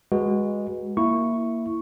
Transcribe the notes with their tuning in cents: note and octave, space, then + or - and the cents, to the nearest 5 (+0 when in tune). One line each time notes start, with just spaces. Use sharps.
G#3 -15 F#4 +0 B4 -25
A#3 +0 E4 +0 C#6 +0